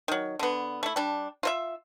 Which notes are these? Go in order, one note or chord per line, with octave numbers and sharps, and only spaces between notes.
D#3 F#3
D3 B3
A3 E4
G3 D4
F4 C5 E5